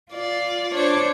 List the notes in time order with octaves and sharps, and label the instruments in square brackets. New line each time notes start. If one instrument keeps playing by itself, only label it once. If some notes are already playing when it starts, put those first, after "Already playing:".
[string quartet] F4 D5
D4 C5 C#5 D6